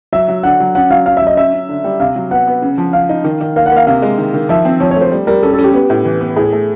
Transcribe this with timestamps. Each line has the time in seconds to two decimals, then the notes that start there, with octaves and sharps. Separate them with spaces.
0.13 F#3 E5
0.28 F#3
0.43 D3 F#5
0.60 F#3
0.75 C#4 F#5
0.90 F#3 F5
1.06 C#4 F5
1.17 F#3 E5
1.27 D#5
1.37 C#4 E5
1.53 C#4
1.69 D3
1.84 G3
2.00 C3 F5
2.16 F#3
2.31 B3 F#5
2.47 B3
2.62 C#3
2.78 F3
2.93 C#3 F5
3.09 D#4
3.24 D#3
3.41 D#3
3.56 A#3 F5
3.66 F#5
3.71 A#3
3.77 F5
3.87 C3 F5
4.02 G#3
4.18 D#3
4.34 D#3
4.49 F3 E5
4.65 C4
4.80 F3 C#5
4.91 C#5
4.96 A3
5.01 C5
5.12 G3
5.27 G3 A#4
5.43 C#4 A4
5.54 A4
5.59 C#4
5.64 G4
5.73 B3
5.90 A2
6.05 E3
6.21 B3
6.36 A2 G#4
6.53 A3